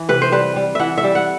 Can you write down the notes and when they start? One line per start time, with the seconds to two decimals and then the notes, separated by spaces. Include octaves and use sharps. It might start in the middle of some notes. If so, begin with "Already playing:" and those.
Already playing: E3
0.09 C3 B4
0.22 C5
0.32 G3 B4
0.56 G3
0.75 E3 E5 F#5
0.98 E5
1.04 G3
1.15 F#5